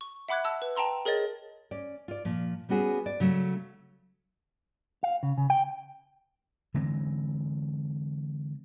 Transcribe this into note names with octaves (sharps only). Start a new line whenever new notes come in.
C#6
E5 F#5 B5 D6 F#6 G#6
A5 E6
B4
G5 A5 A#5 C6 E6
G#4 A#4 C#5 D#5 A6
C#4 D5
F4 D5
A#2 F3
G3 B3 C#4 F#4 G#4
D5
C#3 F#3 A3
F5
C#3
C#3
G5
D3 E3 G#3 C4